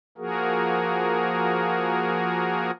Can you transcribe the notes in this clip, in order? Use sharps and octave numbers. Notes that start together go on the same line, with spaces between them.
F3 A#3 F#4 G#4 A#4